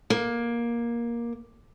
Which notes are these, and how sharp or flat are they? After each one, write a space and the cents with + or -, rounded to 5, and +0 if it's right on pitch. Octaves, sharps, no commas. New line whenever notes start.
A#3 +15